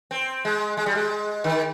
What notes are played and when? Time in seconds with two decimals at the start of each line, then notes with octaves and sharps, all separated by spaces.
0.11 C4
0.45 G#3
0.77 G#3
0.86 G3
0.95 G#3
1.44 D#3